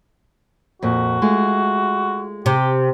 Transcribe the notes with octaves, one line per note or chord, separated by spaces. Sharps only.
F2 A#2 F#4
G#3 A3 F4
C3 G4